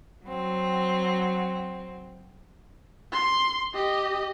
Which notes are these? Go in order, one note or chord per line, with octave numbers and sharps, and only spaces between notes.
F#3 C4
C6
G4 D#5